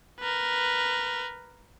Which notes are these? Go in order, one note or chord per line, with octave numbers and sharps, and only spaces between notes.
A#4 B4